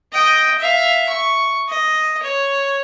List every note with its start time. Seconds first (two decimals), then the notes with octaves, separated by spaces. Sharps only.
0.13 D#5 G5
0.59 E5 F5
1.09 C#6
1.69 D#5
2.22 C#5